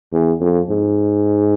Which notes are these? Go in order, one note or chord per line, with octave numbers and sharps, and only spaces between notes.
E2
F2
G#2